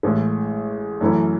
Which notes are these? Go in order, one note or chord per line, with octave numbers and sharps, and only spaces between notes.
A1 A2 G#3
F#2 E3 A3 C#4 E4